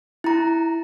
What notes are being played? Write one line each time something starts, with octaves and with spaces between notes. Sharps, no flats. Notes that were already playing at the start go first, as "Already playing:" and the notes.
E4 A#5